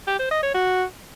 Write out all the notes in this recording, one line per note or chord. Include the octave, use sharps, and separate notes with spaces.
G4
C5
D#5
C#5
F#4